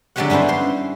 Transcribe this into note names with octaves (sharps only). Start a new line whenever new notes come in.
D3 F#3 G#3 G4 C#5 F#5
G2 B3 C#4 E4 C5
C5 C6